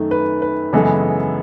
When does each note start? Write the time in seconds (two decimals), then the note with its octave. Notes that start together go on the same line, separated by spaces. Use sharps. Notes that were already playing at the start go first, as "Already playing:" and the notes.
Already playing: F#2 D#3 A3
0.11 B4
0.42 B4
0.73 F#2 C#3 E3 G#3 B3 A4